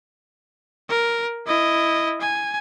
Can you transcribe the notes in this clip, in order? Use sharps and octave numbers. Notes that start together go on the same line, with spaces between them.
A#4
E4 D#5
G#5